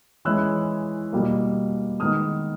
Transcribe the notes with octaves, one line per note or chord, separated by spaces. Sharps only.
E3 G#3 C#4 E4 E6 F#6
B2 G3 A#3
D#3 G#3 B3 D#4 D#6 F6